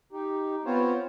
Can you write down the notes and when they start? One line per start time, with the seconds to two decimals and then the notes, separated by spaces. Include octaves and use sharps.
0.13 D#4 G4
0.65 B3 C4 F4 C5 C#5